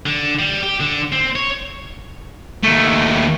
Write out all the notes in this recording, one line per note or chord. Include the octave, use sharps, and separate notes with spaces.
D3
G3
G4
D3
C4
C#5
D#2 A3